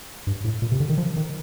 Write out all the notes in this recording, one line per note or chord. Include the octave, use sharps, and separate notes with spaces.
G2
A2
A#2
C3
D3
D#3
F3
D#3